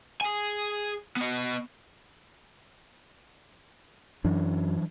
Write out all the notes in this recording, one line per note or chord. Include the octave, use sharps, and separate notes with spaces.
G#4 G#5
B3 D#5
F#2 E3 F#3 D4